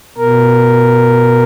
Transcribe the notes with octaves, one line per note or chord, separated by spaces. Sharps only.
B2 A#4